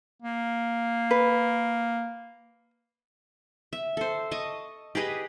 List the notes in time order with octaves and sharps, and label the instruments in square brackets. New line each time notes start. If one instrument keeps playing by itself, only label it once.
[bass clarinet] A#3
[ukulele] B4
[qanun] E5
A4 C5
D#5 A5 C#6
G4 G#4 B4 D#5